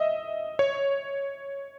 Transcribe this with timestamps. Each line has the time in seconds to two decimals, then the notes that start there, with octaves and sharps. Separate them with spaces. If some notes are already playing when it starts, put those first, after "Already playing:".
Already playing: D#5 E5
0.59 C#5